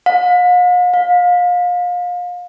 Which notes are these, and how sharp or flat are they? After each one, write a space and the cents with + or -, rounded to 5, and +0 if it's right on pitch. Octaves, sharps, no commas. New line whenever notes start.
F5 +45
F5 +30